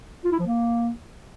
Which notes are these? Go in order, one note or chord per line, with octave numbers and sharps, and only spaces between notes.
F4
E4
F3
A#3